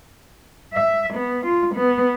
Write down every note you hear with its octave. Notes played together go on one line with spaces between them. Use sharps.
E5
B3
F4
B3